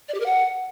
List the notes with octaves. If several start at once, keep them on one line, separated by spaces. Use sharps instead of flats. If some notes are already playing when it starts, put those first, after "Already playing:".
D5
G4
A#4
F#5